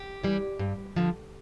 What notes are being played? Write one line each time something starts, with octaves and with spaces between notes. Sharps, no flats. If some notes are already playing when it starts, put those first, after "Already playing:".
Already playing: G4
E3 G3
G2
D3 F3